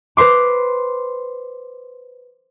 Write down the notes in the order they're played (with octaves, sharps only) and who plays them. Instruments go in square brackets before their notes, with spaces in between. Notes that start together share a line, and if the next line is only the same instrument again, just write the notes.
[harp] B4 C5 C6 D6